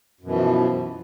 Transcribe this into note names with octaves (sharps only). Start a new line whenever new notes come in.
F#2 B2 E3 F3